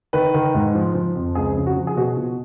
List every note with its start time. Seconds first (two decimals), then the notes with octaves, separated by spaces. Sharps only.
0.13 D#3 B4
0.34 D#3
0.54 G#2
0.75 F3
0.95 F3
1.15 F2
1.35 C#2 G#4
1.56 C#3
1.66 F#4
1.77 F3
1.87 G#4
1.96 B2 F#4
2.16 B2 F4